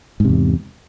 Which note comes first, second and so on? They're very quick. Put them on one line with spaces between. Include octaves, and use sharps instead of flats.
G#2 C3 E2